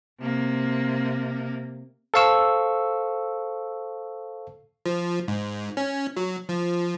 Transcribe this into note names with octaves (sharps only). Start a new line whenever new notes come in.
C3 A#3
A4 C5 F5 C#6 E6
F3
G#2
C#4
F#3
F3